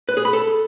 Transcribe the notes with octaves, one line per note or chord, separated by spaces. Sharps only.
B4
G#4
B5
A4